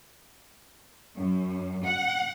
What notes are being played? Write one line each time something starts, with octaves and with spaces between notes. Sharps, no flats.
F#2
F#5